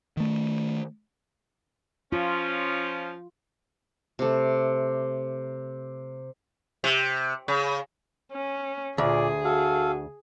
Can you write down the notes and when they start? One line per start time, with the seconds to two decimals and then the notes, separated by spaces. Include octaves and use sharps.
0.17 D#3 A3
2.12 F3 C#4 F4
4.19 C3 A3
6.84 C3
7.48 C#3
8.32 C#4
8.98 D2 A#2 G#4 D5
9.44 F#4 A4 F5